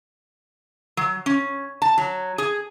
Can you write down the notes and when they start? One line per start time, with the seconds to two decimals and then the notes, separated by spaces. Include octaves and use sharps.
0.97 F#3
1.26 C#4
1.82 A5
1.98 F#3
2.38 G#4